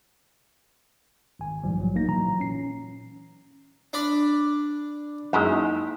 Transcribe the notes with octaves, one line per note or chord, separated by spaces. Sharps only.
G#1 G#5
B1 G#2 E3 F3 G3
A#1 F#3
G1 A#3 D#4 A#6
A#2 E3 F#3 A#5
C#4 C7
D4 D5 B5
F#2 G#3 A#3 D#4 E4